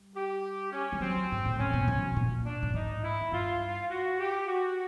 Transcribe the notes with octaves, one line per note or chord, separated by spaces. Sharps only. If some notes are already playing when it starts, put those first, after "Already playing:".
Already playing: G3
G4
C#4
G3
F#3 C4
G#2
A2
A#2 C#4
B2
C3
B2
A#2
D4
A2
G#2 D#4
E4
G#2
G2 F4
F#4
G4
F#4